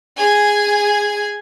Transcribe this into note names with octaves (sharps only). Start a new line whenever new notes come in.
G#4 G#5